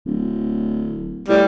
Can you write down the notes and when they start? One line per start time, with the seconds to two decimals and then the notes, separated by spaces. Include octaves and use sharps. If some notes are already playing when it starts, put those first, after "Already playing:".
0.05 D1
1.28 A2 G3